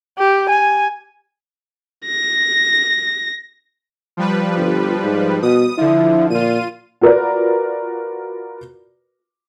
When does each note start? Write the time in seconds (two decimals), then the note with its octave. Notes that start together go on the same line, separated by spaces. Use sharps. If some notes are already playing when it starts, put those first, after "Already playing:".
0.19 G4
0.49 G#5
2.06 A#6
4.17 F3 G3 B4
4.57 G1
5.03 G#2
5.43 B2 D#6
5.78 D3 F3 E4
6.30 A#2 F4 D#7
7.01 F4 F#4 A#4 B4 D5